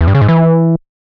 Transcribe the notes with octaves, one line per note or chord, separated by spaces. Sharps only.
E2
G2
C#3
G#2
E3